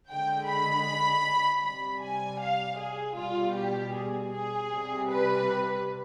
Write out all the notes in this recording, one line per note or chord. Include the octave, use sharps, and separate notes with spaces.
D3 G#3 G5
B5
C3 G3 B5
G#5
F5
G#4
B2 G3 F4
G4
G#4
G#4
C3 G3
B4